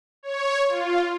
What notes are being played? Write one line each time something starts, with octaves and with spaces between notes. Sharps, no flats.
C#5
F4